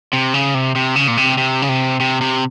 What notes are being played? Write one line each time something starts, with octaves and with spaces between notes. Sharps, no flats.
C3
C#3
C3
C3
C#3
A#2
C3
C3
C#3
C3
C3
C3